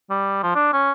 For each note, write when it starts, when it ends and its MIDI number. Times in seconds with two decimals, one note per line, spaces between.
0.10 0.40 55
0.43 0.53 53
0.55 0.73 62
0.73 0.92 61